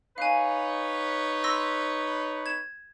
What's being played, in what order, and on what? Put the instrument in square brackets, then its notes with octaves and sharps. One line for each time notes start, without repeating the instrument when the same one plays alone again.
[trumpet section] D#4 B4 C#5 [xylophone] F5 G#5
[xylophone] C6 E6 A#6
G#6 E7